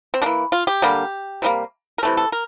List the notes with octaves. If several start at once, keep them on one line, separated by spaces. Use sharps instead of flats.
C4
E3 A#3 D4
F4
G4
D3 G3 A#3
C3 E3 G3 A#3
A#4
C3 E3 A3 A4
A4
A#4